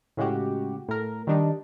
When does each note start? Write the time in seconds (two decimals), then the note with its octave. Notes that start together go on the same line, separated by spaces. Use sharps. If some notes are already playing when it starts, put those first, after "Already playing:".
0.17 A2 C#3 G#3 F#4 G4
0.88 A2 A#4
1.27 D#3 G3 D4 D#4